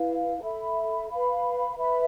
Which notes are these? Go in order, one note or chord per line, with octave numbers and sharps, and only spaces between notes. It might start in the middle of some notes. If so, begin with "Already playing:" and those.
Already playing: E4 B4 F5
A4 E5 B5
B4 F5 B5
B4 E5 B5